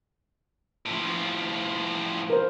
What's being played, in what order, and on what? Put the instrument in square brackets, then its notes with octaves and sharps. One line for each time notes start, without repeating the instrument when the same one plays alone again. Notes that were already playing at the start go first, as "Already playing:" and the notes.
[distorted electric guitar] A2 F3
[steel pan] A#4 C5